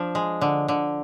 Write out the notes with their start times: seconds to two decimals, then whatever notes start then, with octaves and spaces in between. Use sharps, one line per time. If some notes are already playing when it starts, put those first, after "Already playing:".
Already playing: F3 D4
0.15 G#3
0.41 D3
0.68 D3